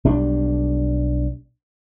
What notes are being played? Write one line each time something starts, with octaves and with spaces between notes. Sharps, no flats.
B1 G3 D4